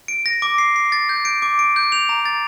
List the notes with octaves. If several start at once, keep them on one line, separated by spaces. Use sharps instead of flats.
D7
A#6
D6
C7
C7
A6
G6
D7
D6
D7
G6
F7
A#5
A6